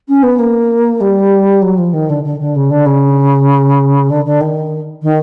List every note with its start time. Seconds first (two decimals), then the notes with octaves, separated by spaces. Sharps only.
0.08 C#4
0.22 B3
0.38 A#3
1.00 G3
1.62 F#3
1.78 F3
1.93 D#3
2.09 D3
2.23 D3
2.39 D3
2.55 C#3
2.70 D3
2.85 C#3
4.10 D3
4.25 D3
4.40 D#3
5.02 D#3